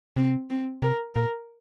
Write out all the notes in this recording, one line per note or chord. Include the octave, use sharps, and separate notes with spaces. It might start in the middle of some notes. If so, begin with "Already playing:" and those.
C3 C4
C4
C3 A#4
A#2 A#4